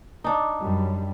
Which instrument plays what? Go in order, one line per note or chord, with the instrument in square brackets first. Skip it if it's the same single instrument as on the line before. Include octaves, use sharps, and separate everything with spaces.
[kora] D4 D#4
[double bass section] F#2 G3